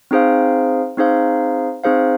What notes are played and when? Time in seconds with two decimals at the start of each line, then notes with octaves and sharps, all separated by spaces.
0.11 C4 D#4 G#4 C5 F5
0.97 C4 D#4 G#4 C5 F5
1.84 C4 D#4 G#4 C5 F5